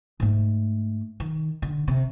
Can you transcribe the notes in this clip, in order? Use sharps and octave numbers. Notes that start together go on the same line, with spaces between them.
G#2 A3
D#3
D3
C3